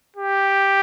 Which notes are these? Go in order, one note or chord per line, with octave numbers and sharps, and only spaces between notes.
G4